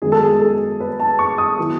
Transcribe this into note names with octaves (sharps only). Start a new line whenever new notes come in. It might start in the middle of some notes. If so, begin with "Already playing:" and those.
F#2 D#3 G#3 B3 G#4
A4
G#4
A4
B4
A5
C#6
D#6
D#3 F#3 B3 E4